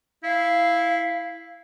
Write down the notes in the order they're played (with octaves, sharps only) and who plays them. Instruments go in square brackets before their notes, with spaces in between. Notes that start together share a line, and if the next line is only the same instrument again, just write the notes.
[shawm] E4 [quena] F5